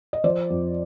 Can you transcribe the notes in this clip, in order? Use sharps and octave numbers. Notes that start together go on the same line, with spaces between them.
D#5
F3 C5 D5
F2